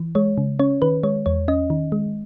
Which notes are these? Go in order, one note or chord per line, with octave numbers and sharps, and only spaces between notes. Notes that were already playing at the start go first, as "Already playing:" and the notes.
Already playing: E3
G#3 C#5
C#3
C#4 C#5
D#3 B4
G#3 C#5
E2 C#5
C#4 D#5
D#3
G#3